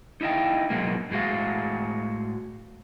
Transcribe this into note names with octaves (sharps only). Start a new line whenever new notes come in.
D#4 E4 D#5 F5 G5
B2 F#3 G#3 A#3
A2 G#3 A#3 F#4 F5